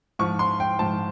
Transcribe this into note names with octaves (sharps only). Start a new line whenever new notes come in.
G#2 F3 C#6
C6
G5
G#2 F3 A5